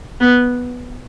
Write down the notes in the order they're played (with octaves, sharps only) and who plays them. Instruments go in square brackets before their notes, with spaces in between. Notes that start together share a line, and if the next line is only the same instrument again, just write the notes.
[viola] B3